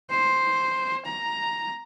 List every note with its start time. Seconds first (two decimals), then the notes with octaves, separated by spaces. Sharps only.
0.10 C5
1.06 A#5